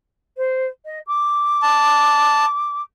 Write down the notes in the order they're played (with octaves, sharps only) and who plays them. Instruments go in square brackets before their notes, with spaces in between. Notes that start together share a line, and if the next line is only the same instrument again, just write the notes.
[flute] C5
D#5
D6
[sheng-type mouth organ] A5